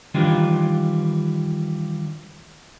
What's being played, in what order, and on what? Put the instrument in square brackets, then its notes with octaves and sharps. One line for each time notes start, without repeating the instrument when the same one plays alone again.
[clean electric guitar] D#3 E3 G3 D4 F4